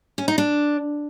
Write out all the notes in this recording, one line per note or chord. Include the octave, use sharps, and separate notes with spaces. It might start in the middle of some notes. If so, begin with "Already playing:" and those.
C#4
D#4
D4